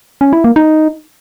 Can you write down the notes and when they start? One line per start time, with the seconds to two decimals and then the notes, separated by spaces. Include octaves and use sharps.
0.21 C#4
0.33 E4
0.44 A#3
0.56 D#4